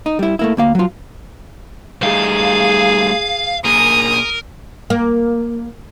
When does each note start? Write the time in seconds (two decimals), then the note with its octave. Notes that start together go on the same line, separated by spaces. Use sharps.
0.06 D#4
0.19 G3 E4
0.39 A3 A#3 E4
0.57 D2 A#3 F5
0.75 F#3 F4
2.03 G3 A3 D#4 G#4 F5
3.65 A#2 G#4 A#4 D#6
4.90 A#3